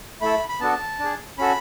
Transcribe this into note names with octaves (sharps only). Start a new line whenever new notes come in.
A3 E4 A4 B5
B5
B3 D4 F#4 A4 A5
D4 G#4
C#4 F#4 A4 B5